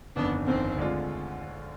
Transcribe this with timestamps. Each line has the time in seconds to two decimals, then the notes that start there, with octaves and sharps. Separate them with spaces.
0.16 G1 F2 D#3 B3 D4
0.46 G1 F2 D#3 C4
0.77 D2 D3 G#3 D4 F4